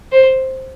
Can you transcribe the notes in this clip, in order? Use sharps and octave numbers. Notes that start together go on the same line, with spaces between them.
C5